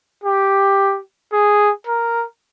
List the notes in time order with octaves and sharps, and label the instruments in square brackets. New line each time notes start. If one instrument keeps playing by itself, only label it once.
[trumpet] G4
G#4
A#4